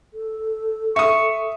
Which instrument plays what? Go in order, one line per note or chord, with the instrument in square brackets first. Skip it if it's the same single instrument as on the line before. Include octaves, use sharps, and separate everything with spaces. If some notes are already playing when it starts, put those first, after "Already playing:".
[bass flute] A4
[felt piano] E5 D#6 [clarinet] C#6